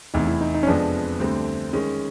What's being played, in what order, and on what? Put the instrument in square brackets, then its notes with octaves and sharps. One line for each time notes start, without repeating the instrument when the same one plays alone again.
[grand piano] F1 E2 C3 [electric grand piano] D#4
[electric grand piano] E4
D#4
D#4
C#4
[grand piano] F2 C3 F3 G#3 B3 [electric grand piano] D4
[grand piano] D2 D3 G3 C4
D#3 G#3 C#4